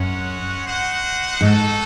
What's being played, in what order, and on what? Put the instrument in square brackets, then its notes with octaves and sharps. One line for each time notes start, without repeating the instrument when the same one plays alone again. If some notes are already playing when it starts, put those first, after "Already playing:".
Already playing: [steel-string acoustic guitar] F#2 [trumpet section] G#3 C#4 F#4 C#5 F#5
[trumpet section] D#4 F#4 C5 F#5
[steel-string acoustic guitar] G#2 [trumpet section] D#4 F#4 A4